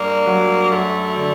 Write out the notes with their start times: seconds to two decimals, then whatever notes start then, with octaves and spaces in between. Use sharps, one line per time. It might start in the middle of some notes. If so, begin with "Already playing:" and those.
Already playing: G2 A#3
0.26 F#3
0.71 F#2 A3
1.16 D3